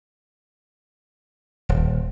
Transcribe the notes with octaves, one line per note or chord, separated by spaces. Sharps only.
D#1